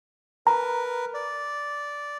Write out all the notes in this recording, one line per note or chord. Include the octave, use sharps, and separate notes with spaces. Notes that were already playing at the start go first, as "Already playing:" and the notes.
A#4 B4 A#5
D5